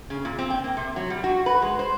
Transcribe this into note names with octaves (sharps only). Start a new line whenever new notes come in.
C#3
A#2
C4
G5
A#3
C3
F#3
G3
F#4
B4
G#3
C5